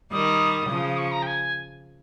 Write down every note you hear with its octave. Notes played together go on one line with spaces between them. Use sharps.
D#3 G3 D#6
C#3 F3
D#6
C#6
A#5
G5
G#5